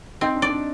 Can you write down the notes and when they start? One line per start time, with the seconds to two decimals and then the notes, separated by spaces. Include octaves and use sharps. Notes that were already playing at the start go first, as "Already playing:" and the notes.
0.21 C4 D#4
0.35 D4
0.42 D5
0.49 D4